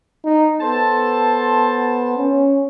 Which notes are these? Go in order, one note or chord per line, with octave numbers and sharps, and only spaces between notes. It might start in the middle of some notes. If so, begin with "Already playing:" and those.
D#4
B3 A4 C5 A5
C#4